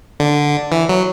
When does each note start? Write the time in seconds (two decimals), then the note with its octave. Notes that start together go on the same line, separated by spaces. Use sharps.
0.20 D3
0.72 E3
0.89 F#3